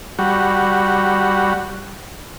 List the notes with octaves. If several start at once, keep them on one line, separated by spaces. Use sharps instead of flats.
G3 F#4